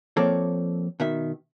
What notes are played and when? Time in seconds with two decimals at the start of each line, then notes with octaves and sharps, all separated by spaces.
0.17 F3 A#3 C4 A4 C#5 D5
1.00 B2 D#3 E5